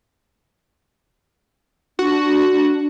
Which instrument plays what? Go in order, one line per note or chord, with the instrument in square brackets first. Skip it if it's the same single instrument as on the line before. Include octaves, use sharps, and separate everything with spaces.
[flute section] D4 [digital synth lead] F#4